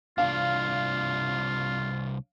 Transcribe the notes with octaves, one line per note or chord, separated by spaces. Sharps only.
C2 D4 F4 F5